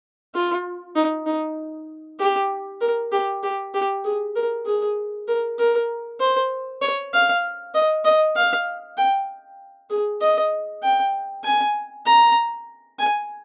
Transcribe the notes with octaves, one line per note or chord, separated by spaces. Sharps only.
F4
D#4
D#4
G4
A#4
G4
G4
G4
G#4
A#4
G#4
A#4
A#4
C5
C#5
F5
D#5
D#5
F5
G5
G#4
D#5
G5
G#5
A#5
G#5